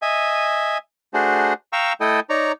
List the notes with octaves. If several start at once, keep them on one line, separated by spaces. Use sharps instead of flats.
D#5 E5 G#5
A3 D4 F#4 G#4 C5
F5 G5 A#5 C#6 E6
A3 E4 A4 D#5 G5
D#4 C#5 D5 A#5